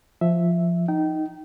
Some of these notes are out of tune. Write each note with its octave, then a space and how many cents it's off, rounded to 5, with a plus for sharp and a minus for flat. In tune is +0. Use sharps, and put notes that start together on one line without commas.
F3 -5 E5 +0
D#4 +0 G5 -25